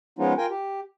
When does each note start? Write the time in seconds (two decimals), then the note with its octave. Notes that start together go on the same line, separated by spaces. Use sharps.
0.19 F3 G#3 B3 C#4 D#4 F4
0.38 F4 A#4 G5 G#5
0.50 G4